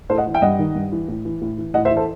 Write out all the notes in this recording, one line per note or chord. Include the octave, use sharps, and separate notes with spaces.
A2 A4 C5
D#5 F#5
E3
E5 G5
G2 D#5 F#5
D#3
G2
E3
A2
E3
A2
E3
A2 D#5 F#5
C5 E5
E3
A4 C5